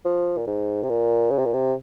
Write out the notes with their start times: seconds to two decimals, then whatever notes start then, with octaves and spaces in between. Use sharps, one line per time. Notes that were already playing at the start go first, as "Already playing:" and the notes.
0.05 F3
0.38 A#2
0.47 G#2
0.83 C3
0.89 A#2
1.31 C#3
1.39 C3
1.45 A#2
1.54 C3